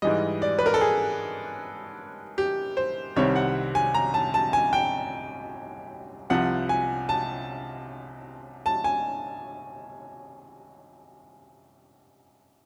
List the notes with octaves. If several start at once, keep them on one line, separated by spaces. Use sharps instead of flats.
G#2 E3 G3 D#5
D5
B4
A#4
A4
G#4
G4
C5
C2 C3 D#3 G3 C4 C#5
F#5
G#5
A#5
A5
A5
G#5
G5
C2 C3 F3 F#5
G#5
A5
A5
G#5